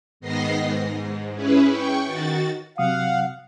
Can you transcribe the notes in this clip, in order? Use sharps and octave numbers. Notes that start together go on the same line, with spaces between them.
G#2 D#3 B3 D#5 A#6 C7
G#2
C#4 E4 G#4 B4
G5 C#6
D#3 F#4 A6
C3 F#3 F5 F#5 D#6